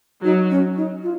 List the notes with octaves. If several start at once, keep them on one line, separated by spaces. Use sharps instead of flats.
F#3 D#4
C#4
D#4
F4